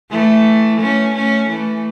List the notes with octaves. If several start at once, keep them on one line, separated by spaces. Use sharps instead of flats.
E3 A3
A3 C#4
A3 C#4
E3 A3